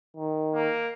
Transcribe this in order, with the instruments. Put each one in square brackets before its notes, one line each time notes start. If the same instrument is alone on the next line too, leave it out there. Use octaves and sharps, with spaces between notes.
[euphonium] D#3
[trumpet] A#3